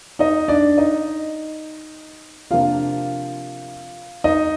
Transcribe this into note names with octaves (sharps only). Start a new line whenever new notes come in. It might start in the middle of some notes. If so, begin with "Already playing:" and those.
D#4 D#5
D4 D5
D#4 D#5
C3 F3 A#3 D4 F4 F5
D#4 D#5